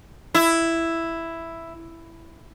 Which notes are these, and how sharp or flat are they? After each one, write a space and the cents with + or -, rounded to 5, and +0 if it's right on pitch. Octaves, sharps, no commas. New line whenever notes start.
E4 +5